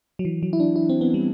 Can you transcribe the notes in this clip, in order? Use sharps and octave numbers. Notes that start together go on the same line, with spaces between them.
F#3
E3
F#3
E4
D4
E4
C4
B3
G3